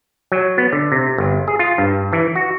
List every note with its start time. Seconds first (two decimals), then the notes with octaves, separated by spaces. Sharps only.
0.32 F#3
0.58 B3
0.73 D3
0.92 C3
1.18 G1
1.48 G#4
1.59 F4
1.78 G2
2.13 E3
2.35 F#4